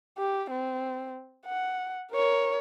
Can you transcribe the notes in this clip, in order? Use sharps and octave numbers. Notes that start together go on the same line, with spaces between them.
G4
C4
F#5
A#4 C#5